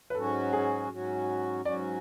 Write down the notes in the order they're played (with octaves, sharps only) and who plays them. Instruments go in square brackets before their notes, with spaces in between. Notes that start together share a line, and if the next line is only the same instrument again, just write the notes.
[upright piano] B4
[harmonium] G#2 F#3 C#4 F#4 [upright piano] A4
[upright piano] G#4
[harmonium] G#2 F#3 C#4 F#4
[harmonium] G#2 F#3 C#4 F#4 [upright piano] D5